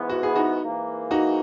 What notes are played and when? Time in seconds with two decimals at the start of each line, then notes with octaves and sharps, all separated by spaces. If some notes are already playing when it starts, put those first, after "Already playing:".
Already playing: G#2 E3 B3 E4
0.10 F#4
0.23 G#4
0.36 D#4 F#4
0.61 G#2 E3 A#3
1.11 D#4 F#4